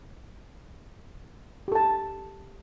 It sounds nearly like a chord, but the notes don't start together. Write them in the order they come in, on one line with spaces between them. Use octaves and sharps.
G4 A4 A5